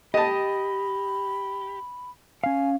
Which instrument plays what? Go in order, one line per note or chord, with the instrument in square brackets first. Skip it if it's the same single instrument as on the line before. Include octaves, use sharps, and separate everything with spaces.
[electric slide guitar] G4 [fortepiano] D#5 A5 [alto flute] B5
[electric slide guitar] C#4 F5 [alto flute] G#5